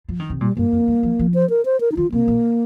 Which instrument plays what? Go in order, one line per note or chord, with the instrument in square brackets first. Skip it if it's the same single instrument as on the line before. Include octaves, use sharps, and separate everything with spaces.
[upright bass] F3
D#3
C3
[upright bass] A#2 [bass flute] G3
[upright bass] G2 [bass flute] A#3
[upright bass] F2
G2
F3
F3
[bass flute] C5
A#4
C5
A#4
D#4
[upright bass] D#3 [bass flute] F4
[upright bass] C3 [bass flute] A#3
[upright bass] A#2